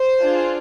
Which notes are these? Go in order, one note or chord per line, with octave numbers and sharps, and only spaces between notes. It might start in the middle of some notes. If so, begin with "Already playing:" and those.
Already playing: C5
D4 F4 G#4